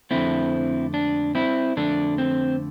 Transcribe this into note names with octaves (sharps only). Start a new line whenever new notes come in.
F2 D3 A3 C4 E4
D4
C4 E4
F2 D3 A3 D4
C4